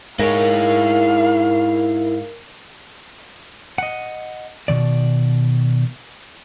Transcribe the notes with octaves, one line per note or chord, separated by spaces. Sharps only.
G#2 E4 A#4 C#5 F5
D#5 F#5
B2 D#3 D5